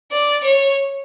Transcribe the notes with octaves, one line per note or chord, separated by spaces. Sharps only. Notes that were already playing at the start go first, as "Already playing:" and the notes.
D5
C#5